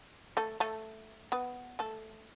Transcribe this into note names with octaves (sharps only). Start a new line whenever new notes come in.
A3 A4
A3 A4
B3 B4
A3 A4